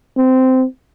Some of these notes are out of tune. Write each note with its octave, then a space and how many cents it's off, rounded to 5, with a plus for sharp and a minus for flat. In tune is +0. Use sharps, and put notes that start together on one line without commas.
C4 -15